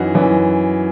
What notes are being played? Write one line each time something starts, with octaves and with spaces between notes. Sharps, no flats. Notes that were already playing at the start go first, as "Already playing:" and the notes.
Already playing: F#2 E3 D#4 F#4
F#2 E3